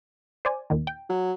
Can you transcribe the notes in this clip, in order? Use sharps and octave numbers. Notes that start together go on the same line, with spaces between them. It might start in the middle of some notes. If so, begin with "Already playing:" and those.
C5 D5 G#5
D#2 A#2 D#3
G5
F#3